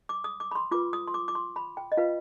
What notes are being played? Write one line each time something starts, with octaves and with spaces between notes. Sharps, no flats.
D6
D#6
D6
B5
C6
F4 B4 D6
D#6
C6
D6
D6
C6
B5
G5
D#5
F4 B4 F5